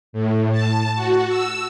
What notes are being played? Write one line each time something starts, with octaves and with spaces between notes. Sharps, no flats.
A2
A5
F#4
E6